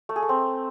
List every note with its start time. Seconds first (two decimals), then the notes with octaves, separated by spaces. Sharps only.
0.09 A3
0.16 G#4
0.22 A3
0.29 C4